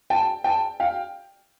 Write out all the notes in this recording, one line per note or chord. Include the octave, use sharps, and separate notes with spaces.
G5 A5
G5 A5
F5 G5